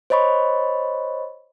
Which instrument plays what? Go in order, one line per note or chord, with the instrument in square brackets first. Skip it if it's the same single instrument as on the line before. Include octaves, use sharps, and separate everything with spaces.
[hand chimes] C5 C#5 D#5 B5 C#6